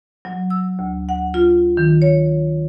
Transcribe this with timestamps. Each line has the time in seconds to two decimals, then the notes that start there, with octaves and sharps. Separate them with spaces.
0.25 F#3
0.50 E6
0.79 D2
1.09 F#5
1.34 F4
1.77 D#3
2.02 C#5